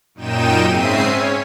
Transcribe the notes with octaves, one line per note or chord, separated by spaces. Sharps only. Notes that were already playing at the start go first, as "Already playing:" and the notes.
F#2 A#2 D#4 G5 D#7 E7
G#2 C#3 C4 E5 C7 D#7
C#4 C#5